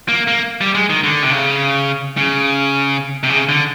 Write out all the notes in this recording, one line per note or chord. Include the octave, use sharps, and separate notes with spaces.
A#3
A#3
G3
G#3
D#3
D3
C3
C#3
C#3
C3
C#3
D3